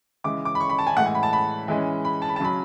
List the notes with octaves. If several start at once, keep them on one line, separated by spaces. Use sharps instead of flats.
C#3 E3 G#3 D6
D6
B5
C#6
B5
A5
G#5
A2 E3 G#3 F#5
G#5
B5
A5
B5
E3 G#3 C#4
B5
A5
B5
A5
C#3 F#3 C#4 B5